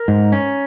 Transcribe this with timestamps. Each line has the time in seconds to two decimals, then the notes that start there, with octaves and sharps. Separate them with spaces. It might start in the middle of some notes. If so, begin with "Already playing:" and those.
Already playing: A#4
0.08 G#2
0.32 C#4